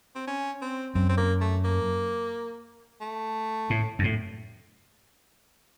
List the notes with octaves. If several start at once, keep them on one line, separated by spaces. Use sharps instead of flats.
C4
C#4
C4
F#2 C4
C4
A#3
A3
A#3
A3
A2
F#2
A2